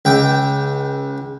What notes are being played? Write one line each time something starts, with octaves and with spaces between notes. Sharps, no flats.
C#2 G5